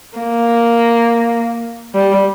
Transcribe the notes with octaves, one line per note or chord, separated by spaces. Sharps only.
A#3
G3